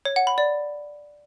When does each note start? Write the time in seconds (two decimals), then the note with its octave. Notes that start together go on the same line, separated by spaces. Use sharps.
0.05 C#5
0.16 F#5
0.27 B5
0.38 D5